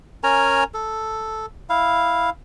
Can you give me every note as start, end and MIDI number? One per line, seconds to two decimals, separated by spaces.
0.24 0.64 61
0.24 0.64 70
0.24 0.64 80
0.24 0.64 82
0.74 1.46 69
1.69 2.30 64
1.69 2.30 77